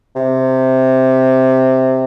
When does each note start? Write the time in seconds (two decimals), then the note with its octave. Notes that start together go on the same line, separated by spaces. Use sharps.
0.15 C3